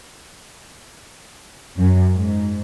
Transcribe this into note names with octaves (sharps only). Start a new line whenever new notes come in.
F#2
G#2